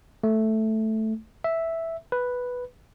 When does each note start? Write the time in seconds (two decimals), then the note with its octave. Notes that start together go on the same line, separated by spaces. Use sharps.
0.24 A3
1.44 E5
2.12 B4